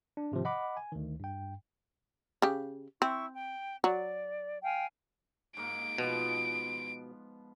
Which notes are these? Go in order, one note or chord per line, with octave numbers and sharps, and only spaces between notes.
D4
G#2 C3 D#3 F3
D#5 F#5 B5 D6
G#5
D2 D#3
G2 G5
C#3 G4
C4 E4 C#6
G5
F#3 D5
F5 G5 G#5
G#2 A#3 D7
B2 F3 B3